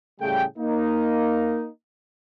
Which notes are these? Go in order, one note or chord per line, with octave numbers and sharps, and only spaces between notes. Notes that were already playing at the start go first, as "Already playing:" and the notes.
A2 C#3 G3 A3 G#4 G5
A#3 D#4